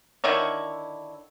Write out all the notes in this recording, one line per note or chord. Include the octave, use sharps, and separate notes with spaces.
D3 D#3 E4 C#5